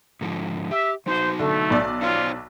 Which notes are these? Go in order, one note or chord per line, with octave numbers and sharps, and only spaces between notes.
G#2 D3 F3
G4 E5
F#3 D#4 F#4 C5
D3 A3
B1 D5
D#4 F4 C5 C#5